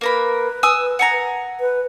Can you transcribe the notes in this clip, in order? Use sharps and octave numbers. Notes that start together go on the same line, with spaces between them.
A#3 A#4 B4 B5
G#5 D#6 E6
F#5 G#5 A#5
B4